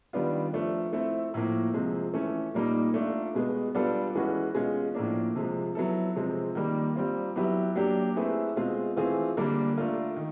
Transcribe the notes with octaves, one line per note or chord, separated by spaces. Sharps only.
D#3 G3 B3 D4 F4
F3 A3 D4
A3 C4 E4 A4
A2 F3 A#3
C3 F3 G#3 C4
E3 A3 C#4
A#2 G3 A#3 D#4
A3 D4 F4
B2 G#3 B3
G3 B3 D4 F4 A4
E3 G#3 C#4 F#4 B4
B2 G#3 C#4 F4
A2 F3 A#3 D4
C3 F3 G#3
F#3 B3 E4 A4
C3 F3 G#3 C4
D#3 G3 A#3
G3 C4 F4
F#3 B3 E4 G4 B4
F#3 A#3 D4 G4
A3 C4 E4 G#4 B4
B2 G#3 C4 F4
E3 A3 C4 F4 G#4
D3 G3 A#3 D4
A3 D4 F4 A#4
D#3